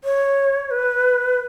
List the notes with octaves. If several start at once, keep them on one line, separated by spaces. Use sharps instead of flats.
C#5
B4